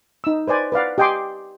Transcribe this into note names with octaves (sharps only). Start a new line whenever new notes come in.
D#4 E6
B4 C5 D5 G#5
B4 D5 F5 F#5
G4 D#5 G5 G#5 C6 D6